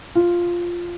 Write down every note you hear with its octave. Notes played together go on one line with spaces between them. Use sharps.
F4